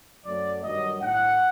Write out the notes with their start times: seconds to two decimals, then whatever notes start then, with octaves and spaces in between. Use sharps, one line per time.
0.24 F#2 F#3 A3 D5
0.63 G2 D#3 F#3 D#5
1.01 A2 A3 F#5